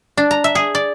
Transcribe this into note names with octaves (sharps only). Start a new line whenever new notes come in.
D4
A#5
E5
G#4
D5